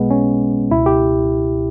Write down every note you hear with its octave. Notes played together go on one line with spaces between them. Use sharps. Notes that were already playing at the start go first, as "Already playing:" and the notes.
Already playing: B1 B2 G#3 B3
C#4
C#2 B2 E4
G4